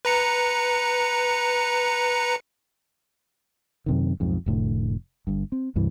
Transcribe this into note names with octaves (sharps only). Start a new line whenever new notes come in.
B4 A#5 C#7
F#2 C3 D#3
B1 F2 G#2
F1 A2 D3
G1 G2
C4
C#2 G2 C3 E3